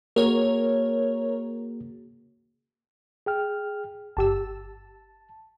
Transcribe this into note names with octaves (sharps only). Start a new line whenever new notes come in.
A#3 F#4 G#4 A#4 C#5
G#4 G5 F6
G1 G4 A5 E6